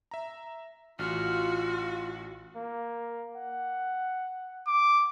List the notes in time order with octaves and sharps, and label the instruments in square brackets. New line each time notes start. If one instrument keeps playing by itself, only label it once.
[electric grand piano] E5 A#5
[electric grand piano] A1 [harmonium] F4 [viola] F#4 [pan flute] F6
[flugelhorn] A#3
F#5
[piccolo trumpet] D6